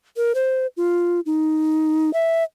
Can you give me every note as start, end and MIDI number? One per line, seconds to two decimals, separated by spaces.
0.17 0.32 70
0.35 0.67 72
0.77 1.20 65
1.26 2.13 63
2.14 2.43 76